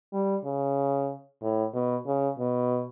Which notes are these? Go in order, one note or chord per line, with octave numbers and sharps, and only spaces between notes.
G3
C#3
A2
B2
C#3
B2